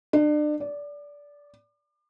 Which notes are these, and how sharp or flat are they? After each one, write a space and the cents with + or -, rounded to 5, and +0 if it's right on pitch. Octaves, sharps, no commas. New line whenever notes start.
D4 +35
D5 -20